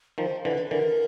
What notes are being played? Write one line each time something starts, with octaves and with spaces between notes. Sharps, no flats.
D#3 F3 C5
D3 E3 B4
D3 E3 A#4